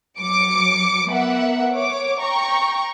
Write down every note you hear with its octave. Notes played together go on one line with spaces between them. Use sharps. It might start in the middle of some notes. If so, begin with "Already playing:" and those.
F#3 D6 C#7
B3 A#4 E5 F#5
C#5 D6
G5 A#5 C#6